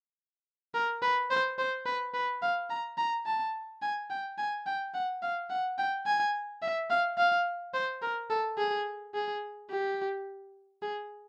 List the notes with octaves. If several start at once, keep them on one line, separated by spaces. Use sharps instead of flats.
A#4
B4
C5
C5
B4
B4
F5
A#5
A#5
A5
G#5
G5
G#5
G5
F#5
F5
F#5
G5
G#5
E5
F5
F5
C5
A#4
A4
G#4
G#4
G4
G#4